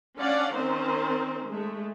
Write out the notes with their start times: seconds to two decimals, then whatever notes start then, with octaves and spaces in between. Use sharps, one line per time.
0.18 C#4 D4 D5 F5 F#5
0.56 D#3 C4 C#4 A#4 C5
1.48 G#3 A3